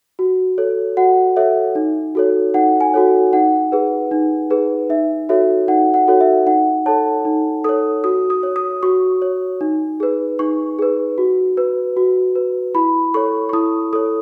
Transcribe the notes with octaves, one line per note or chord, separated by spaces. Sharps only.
F#4
A4 C#5
F#4 F#5
A4 C#5 E5
D#4
F#4 A4 C#5
D#4 F#5
G#5
F#4 A4 C#5
D#4 F#5
G#4 B4
D#4
G#4 B4
D#4 E5
F#4 A4 C#5 E5
D#4 F#5
F#5
F#4 A4 C#5
E5
D#4 F#5
A4 C#5 A5
D#4
A4 C#5 D#6
F#4 D#6
D#6
C#5
D#6
F#4 C#6
C#5
D#4
G#4 B4
D#4 C#6
G#4 B4
F#4
B4
F#4
B4
E4 B5
A4 C#5 C#6
C#6
E4 D#6
A4 C#5 D#6